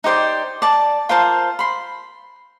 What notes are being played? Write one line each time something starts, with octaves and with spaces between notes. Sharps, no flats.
D#4 G4 C5 D5
D5 A5
F4 A#4 C5 A5
B5 C6